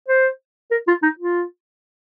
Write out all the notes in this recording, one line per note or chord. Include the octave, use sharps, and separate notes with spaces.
C5
A#4
F4
D#4
F4